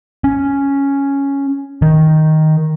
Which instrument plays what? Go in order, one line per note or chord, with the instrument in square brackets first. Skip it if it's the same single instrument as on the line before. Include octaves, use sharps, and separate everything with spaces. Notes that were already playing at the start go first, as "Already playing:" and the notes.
[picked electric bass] C#4
D#3